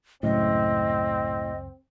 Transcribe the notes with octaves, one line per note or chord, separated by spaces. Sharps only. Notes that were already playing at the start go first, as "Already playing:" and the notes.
C#2 F#2 A2 C#3 C4 D#5